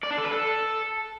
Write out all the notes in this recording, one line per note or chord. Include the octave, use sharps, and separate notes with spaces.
D5
D4
A4
B4
A4